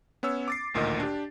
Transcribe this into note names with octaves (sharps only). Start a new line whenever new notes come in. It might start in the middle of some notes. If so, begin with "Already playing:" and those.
B3 C#4 C#5 E6
D6 A6 C7
A1 D2 A#2 D#3 A#4 D#5
D4 G4